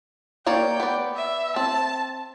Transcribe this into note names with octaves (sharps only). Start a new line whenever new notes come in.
A#3 C#5 D5 G5
B3 D5
E5
C4 A5